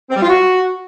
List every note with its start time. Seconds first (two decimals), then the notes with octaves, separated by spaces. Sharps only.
0.10 C4
0.16 G3
0.22 F4
0.29 F#4